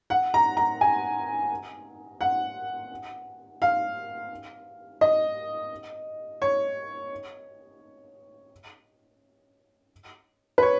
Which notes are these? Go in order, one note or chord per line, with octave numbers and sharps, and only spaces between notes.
F#5
A#5
A#5
G#5
F#5
F5
D#5
C#5
B4
C#5